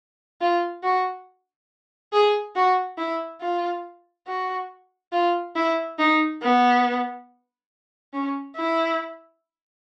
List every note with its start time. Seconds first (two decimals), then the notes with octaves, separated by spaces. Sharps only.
0.41 F4
0.83 F#4
2.13 G#4
2.56 F#4
2.98 E4
3.41 F4
4.27 F#4
5.13 F4
5.56 E4
5.99 D#4
6.42 B3
8.13 C#4
8.56 E4